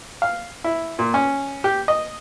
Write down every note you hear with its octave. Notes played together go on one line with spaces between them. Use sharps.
F5
E4
A#2
C#4
G4
D#5